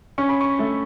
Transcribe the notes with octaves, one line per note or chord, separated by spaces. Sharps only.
C#4 C#6
B5
C#6
A3